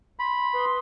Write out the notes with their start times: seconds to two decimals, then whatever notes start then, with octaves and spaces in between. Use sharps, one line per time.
0.19 B5 C6
0.53 B4 C6 D#6